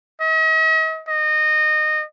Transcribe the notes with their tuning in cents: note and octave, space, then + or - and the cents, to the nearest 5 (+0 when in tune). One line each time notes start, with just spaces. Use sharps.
D#5 +40
D#5 -20